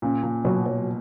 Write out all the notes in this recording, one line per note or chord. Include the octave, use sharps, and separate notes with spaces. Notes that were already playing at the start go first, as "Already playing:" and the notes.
A#2 C#4
A#2
B2 F#3
B2